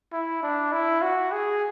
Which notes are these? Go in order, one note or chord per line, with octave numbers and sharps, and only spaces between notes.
E4
D4
E4
F#4
G#4